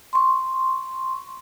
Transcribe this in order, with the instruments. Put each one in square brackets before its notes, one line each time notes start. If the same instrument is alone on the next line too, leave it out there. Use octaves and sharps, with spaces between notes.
[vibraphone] C6 C#6